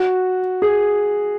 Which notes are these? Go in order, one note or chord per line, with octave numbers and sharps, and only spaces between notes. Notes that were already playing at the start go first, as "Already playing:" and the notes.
Already playing: F#4
G#4